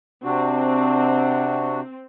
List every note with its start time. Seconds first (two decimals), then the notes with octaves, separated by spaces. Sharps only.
0.24 C3 C4 D4 F#4